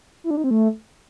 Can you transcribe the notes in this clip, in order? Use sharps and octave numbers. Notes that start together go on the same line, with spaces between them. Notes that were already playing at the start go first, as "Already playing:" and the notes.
E4
D4
D#4
C4
A3